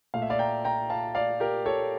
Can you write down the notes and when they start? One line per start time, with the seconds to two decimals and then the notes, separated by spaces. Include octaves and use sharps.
0.14 A#2 A3 F5
0.22 E5
0.30 D5 F5
0.39 G5 A#5
0.65 G5 A#5
0.90 F5 A5
1.15 D5 F5
1.40 G4 A#4
1.66 A4 C#5